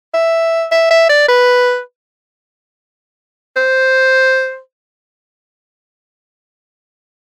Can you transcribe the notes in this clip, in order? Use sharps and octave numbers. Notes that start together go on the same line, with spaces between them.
E5
E5
E5
D5
B4
C5